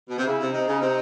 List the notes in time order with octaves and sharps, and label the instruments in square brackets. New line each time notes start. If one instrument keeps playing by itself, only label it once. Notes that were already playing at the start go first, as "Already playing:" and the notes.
[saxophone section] B2
C3
[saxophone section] C#3 [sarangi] E4
[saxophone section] C3
[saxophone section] C3 [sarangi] D#4
[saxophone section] C#3
C3